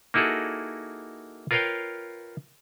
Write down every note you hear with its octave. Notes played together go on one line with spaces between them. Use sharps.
A#3 D#4 E4 F#4 G#4 A4
F4 A#4 B4 C#5 F5 G5